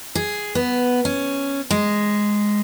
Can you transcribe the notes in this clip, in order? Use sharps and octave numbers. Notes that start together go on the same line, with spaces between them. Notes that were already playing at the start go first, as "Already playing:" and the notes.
G#4
B3
C#4
G#3